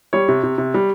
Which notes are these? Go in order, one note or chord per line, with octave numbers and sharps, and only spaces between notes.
G3 C#5
C3
C3
C3
G3